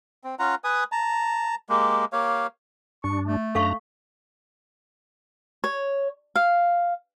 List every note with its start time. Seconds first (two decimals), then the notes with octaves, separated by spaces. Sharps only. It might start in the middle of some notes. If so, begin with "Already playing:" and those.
0.24 C4
0.39 C#4 F4 F#5 A#5
0.64 B4 G#5 D#6
0.92 A5 A#5
1.69 G#3 A#3 G4
2.13 A#3 G4 C#5 F5
3.04 G2 D4 C#6
3.26 A3
3.55 F#2 D4 A4 F5 A#5 C#6
5.64 C#5
6.36 F5